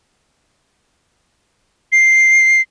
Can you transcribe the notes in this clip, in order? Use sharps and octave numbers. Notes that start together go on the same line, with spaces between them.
C7